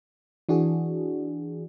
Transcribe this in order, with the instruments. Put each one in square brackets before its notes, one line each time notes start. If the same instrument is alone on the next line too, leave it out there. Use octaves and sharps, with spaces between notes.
[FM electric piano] E3 D4 F#4 G#4